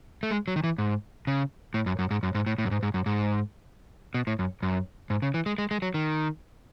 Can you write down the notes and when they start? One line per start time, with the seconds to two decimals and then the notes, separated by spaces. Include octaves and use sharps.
0.23 A3
0.31 G#3
0.48 F#3
0.56 D#3
0.64 E3
0.78 G#2
1.27 C#3
1.74 A2
1.86 F#2
1.99 F#2
2.11 G#2
2.23 F#2
2.35 G#2
2.46 A2
2.58 A2
2.65 F#2
2.71 G#2
2.83 G#2
2.94 F#2
3.06 G#2
4.14 B2
4.27 A2
4.39 F#2
4.63 F#2
5.10 G#2
5.22 C#3
5.34 E3
5.46 G#3
5.58 G#3
5.71 G#3
5.82 F#3
5.94 D#3